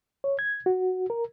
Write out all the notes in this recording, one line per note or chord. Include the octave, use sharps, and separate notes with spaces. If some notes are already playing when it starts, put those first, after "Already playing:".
C#5
G#6
F#4
A#4